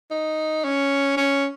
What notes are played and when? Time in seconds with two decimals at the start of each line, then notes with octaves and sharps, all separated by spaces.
0.11 D#4
0.65 C#4
1.17 C#4